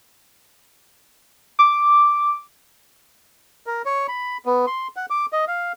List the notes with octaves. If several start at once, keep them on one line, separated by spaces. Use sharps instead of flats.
D6
A#4
C#5
B5
B3
C6
F#5
D6
D#5
F5